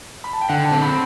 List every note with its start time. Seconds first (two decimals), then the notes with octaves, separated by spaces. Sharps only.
0.24 B5
0.33 A5
0.41 G5
0.49 D3 F#5
0.65 A5
0.72 C4
0.82 B5